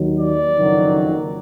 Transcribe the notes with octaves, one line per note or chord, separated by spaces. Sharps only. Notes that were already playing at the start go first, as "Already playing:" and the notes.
Already playing: D#2 D#3 F#3
D5
F#1 F2 D#3 F#3